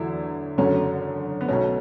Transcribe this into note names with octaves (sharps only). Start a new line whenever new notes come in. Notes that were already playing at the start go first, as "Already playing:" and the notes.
Already playing: E2 D3 F#3 A3 E4
F#1 F#2 D3 F#3 A3 C#4
B3
B1 B2 A3 C#4